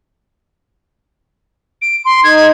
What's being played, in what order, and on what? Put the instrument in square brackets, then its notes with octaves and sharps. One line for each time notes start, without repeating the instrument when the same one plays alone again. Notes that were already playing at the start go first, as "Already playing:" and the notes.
[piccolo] D7
C6
[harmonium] D#4 [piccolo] G#6